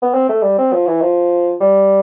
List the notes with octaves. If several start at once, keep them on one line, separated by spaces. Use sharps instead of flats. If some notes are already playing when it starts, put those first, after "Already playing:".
B3
C4
A3
G3
C4
F3
E3
F3
G3